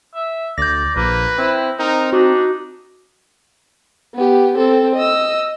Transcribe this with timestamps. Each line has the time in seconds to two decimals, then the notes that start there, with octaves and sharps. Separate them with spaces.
0.15 E5
0.58 D2 D5 G6 A#6
0.96 A#1 A#3 B4
1.38 C4 E4
1.79 C4 D#4 A#4
2.13 D4 D#4 F#4
4.15 B3 G4
4.58 C4 A4
4.96 D#5 E6